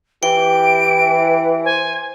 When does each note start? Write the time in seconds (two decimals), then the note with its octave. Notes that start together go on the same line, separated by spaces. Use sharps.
0.23 E3 G4 G5 D7
1.65 C5 G#5